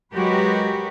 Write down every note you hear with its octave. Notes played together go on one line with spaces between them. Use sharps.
F#3 G#3 F#4 G4 A#4 B4